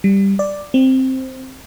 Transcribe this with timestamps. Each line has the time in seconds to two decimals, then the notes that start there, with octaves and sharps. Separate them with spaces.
0.04 G3
0.39 D5
0.74 C4